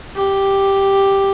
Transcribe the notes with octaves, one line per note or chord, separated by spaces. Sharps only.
G4